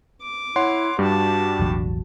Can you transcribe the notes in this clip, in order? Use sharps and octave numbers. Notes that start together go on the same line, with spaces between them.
D6
E4 C#5 F#5 C6
G2 G3 D4 F#4 G4 A5
E1 A1 F#3